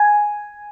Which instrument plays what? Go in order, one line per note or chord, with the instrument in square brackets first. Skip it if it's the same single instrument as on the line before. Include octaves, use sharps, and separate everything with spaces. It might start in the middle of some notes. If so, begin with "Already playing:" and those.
Already playing: [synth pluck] G#5